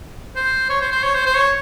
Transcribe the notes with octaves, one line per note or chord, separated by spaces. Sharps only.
C5
C#5
C5
C5
C#5
C5
C5
C#5